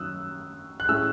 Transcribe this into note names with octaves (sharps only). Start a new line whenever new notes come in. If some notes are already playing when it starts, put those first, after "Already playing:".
Already playing: F#2 D#3 F#3 C#4 D#6 E6 F#6
F#6
A2 G#3 C#4 E4 E6